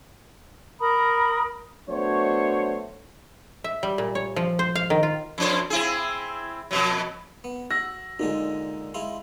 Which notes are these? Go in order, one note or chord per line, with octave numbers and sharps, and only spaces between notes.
A#4 A#5 B5 D#6
F#3 A3 B3 D4 C5 C#5
E5
G3
A#2
C#5
F3
C5
F5
D#3
F4
F2 D4 C5
C4 E4 G#4
F2 B2 F#3
B3
F#4 E6 A#6
A#2 D3 G#3 D#4
G#3 E4 F4